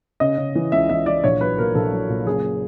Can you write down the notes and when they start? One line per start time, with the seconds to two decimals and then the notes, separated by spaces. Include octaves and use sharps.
0.20 C#3 D#5
0.38 C#3
0.55 E3
0.72 C#2 E5
0.89 E3 E5
1.06 E3 D5
1.24 A#1 C#5
1.41 F#3 B4
1.58 A#2 A#4
1.75 A#1 A4
1.93 F#3
2.09 A#2
2.26 F#1 G#4